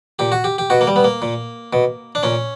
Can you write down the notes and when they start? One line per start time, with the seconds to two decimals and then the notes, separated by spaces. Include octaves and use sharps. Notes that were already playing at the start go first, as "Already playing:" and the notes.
0.19 A#2 G4
0.32 F#4
0.44 G4
0.58 G4
0.70 B2 F#4
0.81 A#3
0.87 G3
0.96 B3
1.04 A#3
1.22 A#2
1.73 B2
2.15 D4
2.23 A#2 C#4